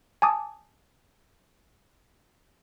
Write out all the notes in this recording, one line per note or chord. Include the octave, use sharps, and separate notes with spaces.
G#5 A5 D6 D#6